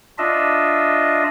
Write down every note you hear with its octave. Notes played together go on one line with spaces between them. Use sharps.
D4 F4 D#5 E5